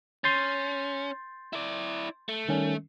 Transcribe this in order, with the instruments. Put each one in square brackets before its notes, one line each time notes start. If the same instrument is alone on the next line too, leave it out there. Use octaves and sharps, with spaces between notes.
[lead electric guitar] C#4 [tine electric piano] C6 G6 A6
[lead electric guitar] E4 D5
A3
[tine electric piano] D#3 G3 C#4